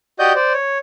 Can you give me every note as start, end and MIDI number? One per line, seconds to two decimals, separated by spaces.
0.19 0.33 66
0.19 0.33 67
0.19 0.33 74
0.19 0.33 75
0.19 0.33 87
0.19 0.33 91
0.36 0.53 72
0.36 0.53 74
0.53 0.78 73